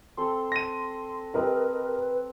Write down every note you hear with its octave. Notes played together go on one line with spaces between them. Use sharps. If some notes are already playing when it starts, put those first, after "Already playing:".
C4 A4 C6
A#6 D#7
C4 G4 A#4 B4 D#5